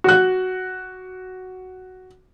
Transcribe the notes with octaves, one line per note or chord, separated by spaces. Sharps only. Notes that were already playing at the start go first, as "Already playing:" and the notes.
F#4 F#6